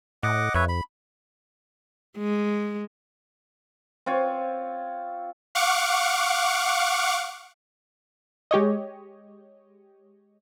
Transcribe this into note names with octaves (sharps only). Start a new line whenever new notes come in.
A2 D#5 F#5 D6
F2 B4 C#5 E5
B5
G#3
C4 F4 C#5
F5 F#5 C#6 D6
G#3 G4 C#5 D#5